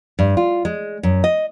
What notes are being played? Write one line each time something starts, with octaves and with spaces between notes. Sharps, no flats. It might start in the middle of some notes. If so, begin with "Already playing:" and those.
G2
F4
G#3
F#2
D#5